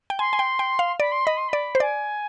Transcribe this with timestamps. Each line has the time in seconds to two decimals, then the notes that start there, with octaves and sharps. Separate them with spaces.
0.10 G5
0.19 G#5 C6
0.33 G#5
0.39 G5
0.59 G5
0.79 F5
1.00 D5 B5
1.11 C6
1.25 D#5 B5
1.37 C6
1.48 D5 B5
1.75 C5
1.80 D5 G#5